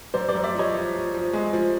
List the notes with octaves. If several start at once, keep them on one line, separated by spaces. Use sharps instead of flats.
F#2 C5 D5
C5 D5
F#2
D5 E5
F3 C#5 D#5
F3
F3
F3
G#3
F3